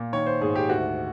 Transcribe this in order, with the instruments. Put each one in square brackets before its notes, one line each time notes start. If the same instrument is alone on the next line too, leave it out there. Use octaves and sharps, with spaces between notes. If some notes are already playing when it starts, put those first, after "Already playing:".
Already playing: [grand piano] A#2
D#3 C#5
C5
G#2 G#4
G4
D2 F#4